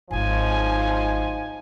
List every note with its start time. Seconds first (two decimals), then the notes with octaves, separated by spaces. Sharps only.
0.11 G#1 G#2 F3 F#3 G#3 D#4 G#5